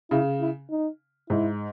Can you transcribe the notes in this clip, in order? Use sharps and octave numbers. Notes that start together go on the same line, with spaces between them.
C#3 E4
E4
D#4
G#2 E4